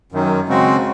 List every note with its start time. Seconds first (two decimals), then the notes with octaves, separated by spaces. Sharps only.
0.12 F#2 D#3 F#3
0.48 C#3 G#3 C4 F#4